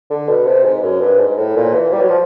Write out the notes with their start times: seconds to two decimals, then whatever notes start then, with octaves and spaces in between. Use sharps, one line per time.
0.10 D3
0.29 B2
0.47 C3
0.65 G#2
0.83 F#2
1.00 G2
1.19 G#2
1.37 A2
1.56 A#2
1.74 E3
1.93 G3
2.00 F#3
2.09 F3